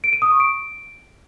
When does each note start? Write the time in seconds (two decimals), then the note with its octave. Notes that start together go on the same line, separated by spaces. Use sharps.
0.04 D7
0.13 D#7
0.22 D#6
0.31 C#6
0.40 D7